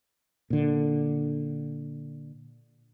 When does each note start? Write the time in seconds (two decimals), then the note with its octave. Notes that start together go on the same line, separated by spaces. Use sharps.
0.50 A#2 D3